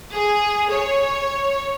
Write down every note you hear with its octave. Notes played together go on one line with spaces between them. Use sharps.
G#4
C#5